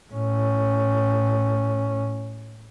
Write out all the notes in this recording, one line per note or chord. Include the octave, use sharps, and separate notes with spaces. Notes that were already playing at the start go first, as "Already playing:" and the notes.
A2 C#4